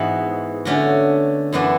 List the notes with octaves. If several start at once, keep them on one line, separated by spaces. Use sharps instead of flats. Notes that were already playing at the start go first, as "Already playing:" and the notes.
Already playing: G#2 E3 B3 F#4
D3 A3 C#4 F#4
F#2 E3 B3 D4 F#4